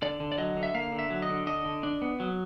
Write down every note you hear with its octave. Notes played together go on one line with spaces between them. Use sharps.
D3 D5
D3
D5
F#3 D#5
D3
E5
A#3 F5
D3
E5
F#3
D#5
D3
D4 D#5
D3
D4
B3
F#3